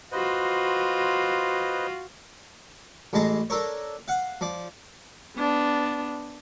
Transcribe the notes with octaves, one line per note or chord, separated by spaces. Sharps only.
F4 F#4 B4 C5 D#5
A1 A2 G#3 A5 A#5
D4 A4 A#4 C#5
F5 F#5
F3 D5
B3 D4